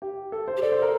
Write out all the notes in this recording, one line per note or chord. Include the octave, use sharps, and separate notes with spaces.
G4
A4
C5
G4
A4 D5
C5
A#4